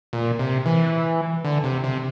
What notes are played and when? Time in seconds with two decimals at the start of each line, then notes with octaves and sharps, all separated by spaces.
0.13 A#2
0.39 C3
0.66 E3
1.45 D3
1.64 C3
1.84 C3